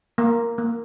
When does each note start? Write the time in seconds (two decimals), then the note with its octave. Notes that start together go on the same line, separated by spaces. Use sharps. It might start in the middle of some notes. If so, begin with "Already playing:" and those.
0.18 A#3
0.58 A#3